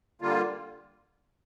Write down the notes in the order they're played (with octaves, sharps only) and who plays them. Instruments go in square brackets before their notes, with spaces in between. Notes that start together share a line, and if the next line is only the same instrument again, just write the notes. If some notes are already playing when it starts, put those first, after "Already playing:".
[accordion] D3 G3 A#3 F4